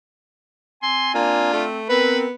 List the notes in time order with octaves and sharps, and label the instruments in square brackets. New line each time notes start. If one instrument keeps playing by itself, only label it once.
[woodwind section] C4 G#5 [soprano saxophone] C6
[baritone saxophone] A#3 [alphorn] D4 [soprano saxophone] F4
[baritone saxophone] A3 [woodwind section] C4
[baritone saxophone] B3 [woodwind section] C4 [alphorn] A#4 [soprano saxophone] B4